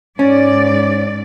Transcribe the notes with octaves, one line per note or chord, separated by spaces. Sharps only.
G#2 C#4 D5